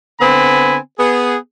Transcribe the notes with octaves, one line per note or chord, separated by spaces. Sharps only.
D3 B3 C4 G#5 B5
B3 G#4